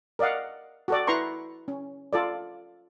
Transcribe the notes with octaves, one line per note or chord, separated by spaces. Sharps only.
A#4 D5 D#5 F5 F#5
F#4 A4 D5
E4 B4 A#5 C6 C#6
C#4
F4 A4 D5